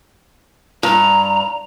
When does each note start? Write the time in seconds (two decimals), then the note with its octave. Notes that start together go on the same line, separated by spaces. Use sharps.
0.83 G2 A#5